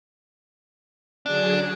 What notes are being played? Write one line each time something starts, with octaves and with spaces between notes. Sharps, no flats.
D3 F#3 D4 G#4